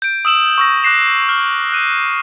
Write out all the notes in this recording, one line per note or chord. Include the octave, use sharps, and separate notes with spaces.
G6 D7
D#6 E6 E7 F#7
C#6 E6 A#6
D6 F#6 A#6 C7 E7
F6
F#6 D#7